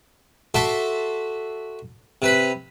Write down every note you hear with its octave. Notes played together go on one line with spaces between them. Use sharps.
F#4 A4 E5 A5 C6 D6
C3 B4 B5